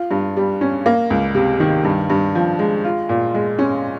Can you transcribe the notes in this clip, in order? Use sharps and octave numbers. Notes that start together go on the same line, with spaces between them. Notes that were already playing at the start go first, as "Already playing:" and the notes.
Already playing: F4
G2
G3
C#4
A#3
C#2
C3
D#3
G2
G2
F3
G#3
F4
A#2
G#3
C#4